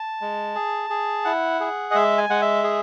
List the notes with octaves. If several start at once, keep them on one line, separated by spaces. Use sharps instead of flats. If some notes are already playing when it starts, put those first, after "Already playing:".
Already playing: A5
G#3
G#4
G#4
E4 F#5
G#4
D#5
G#3 E5
G#5
G#3 F#5
E5
G#4